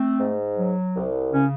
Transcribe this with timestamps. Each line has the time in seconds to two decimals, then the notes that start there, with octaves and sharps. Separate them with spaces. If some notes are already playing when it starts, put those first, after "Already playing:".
Already playing: A3 C4
0.19 G#2
0.57 F#3
0.95 C2
1.33 C#3 C#4